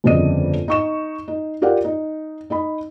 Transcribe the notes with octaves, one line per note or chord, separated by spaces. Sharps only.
G1 F2 C#3 D5 D#5 D#7
D#4 C#6 E7
D#4
F4 G4 A#4 D5 F5 F#5
D#4
D#4 D#5 B5